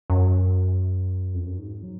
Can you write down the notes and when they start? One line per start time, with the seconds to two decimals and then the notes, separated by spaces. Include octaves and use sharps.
0.10 F#2
1.34 F2
1.46 F#2
1.59 G#2
1.83 F#3